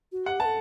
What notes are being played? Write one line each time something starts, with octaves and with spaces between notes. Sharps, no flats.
F#4
G4 F#5
B4 A5
A4